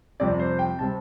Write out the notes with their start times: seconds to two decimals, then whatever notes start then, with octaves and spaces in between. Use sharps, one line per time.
0.20 F2 C3 G3 C4 D5
0.40 C5
0.59 G5
0.79 C3 G3 C4 A5